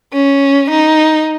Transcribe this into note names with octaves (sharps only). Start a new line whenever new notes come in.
C#4
D#4